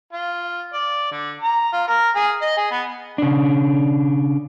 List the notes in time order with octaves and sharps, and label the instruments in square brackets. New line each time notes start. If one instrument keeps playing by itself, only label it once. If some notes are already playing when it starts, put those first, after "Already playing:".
[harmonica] F4
D5
D3
A#5
F4
A#4
G#4
D#5
G#4
B3
[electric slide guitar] C#3 D4